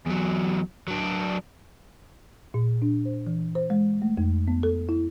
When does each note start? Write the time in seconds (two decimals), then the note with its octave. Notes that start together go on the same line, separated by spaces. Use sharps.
0.06 E2 F#3
0.88 F#3 D4
2.54 A#2
2.82 D4
3.05 C5
3.27 E3
3.55 C5
3.70 G#3
4.02 A3
4.17 F2
4.48 B3
4.63 A4
4.89 E4